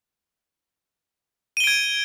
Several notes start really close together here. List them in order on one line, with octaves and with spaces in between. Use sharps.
D#7 G7 D7 G#6